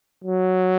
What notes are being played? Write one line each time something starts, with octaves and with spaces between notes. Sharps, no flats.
F#3